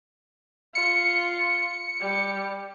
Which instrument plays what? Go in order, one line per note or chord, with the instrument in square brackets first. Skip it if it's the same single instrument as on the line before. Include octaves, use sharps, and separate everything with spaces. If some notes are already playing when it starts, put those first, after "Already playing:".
[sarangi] F4 [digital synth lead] C#7
[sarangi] G3